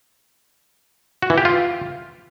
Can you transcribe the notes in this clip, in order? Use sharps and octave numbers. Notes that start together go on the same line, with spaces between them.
F#4
E3
G4
F4